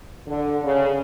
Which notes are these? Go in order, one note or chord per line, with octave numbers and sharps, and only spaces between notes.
D3
C#3